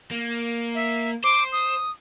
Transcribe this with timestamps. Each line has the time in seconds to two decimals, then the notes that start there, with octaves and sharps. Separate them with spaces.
0.11 A#3
0.75 E5
1.24 C5 D6
1.52 D#6